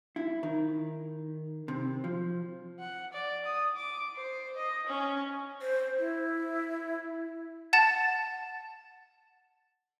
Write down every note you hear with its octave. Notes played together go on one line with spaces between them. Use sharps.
E4
D#3
C3
F3
F#5
D5
D#6
D6
C5
D#5
C#4
C5
E4
F#5 A5 A6 E7